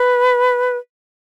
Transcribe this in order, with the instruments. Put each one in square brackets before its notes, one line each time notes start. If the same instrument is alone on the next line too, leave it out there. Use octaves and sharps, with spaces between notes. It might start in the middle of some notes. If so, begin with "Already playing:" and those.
Already playing: [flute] B4